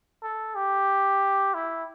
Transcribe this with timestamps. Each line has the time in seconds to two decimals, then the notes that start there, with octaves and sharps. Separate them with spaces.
0.23 A4
0.55 G4
1.54 E4